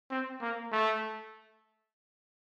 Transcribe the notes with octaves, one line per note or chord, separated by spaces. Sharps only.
C4
A#3
A3